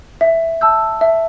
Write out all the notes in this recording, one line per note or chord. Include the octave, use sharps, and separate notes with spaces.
E5
A5 E6 G6
E5